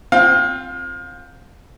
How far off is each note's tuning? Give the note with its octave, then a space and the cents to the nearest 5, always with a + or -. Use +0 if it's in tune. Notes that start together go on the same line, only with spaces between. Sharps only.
C4 +0 F4 +0 F5 +30